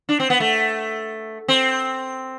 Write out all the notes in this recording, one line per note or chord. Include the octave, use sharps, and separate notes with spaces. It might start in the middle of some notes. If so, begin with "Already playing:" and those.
D4
C4
B3
A3
C4